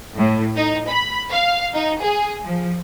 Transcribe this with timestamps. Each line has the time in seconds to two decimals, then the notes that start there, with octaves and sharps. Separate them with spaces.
0.16 A2
0.57 D#4
0.88 B5
1.32 F5
1.75 D#4
2.03 G#4
2.44 F3